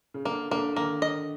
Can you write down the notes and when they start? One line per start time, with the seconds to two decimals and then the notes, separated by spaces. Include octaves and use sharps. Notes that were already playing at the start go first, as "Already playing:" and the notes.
0.14 C#3
0.25 D3 A#3
0.51 D3 A#3
0.76 D#3 A#3
1.02 D#5